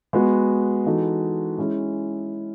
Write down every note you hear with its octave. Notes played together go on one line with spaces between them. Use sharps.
G#3 B3 F#4
E3 G#3 D#4 F#4 A4
G#3 C#4 E4 G#4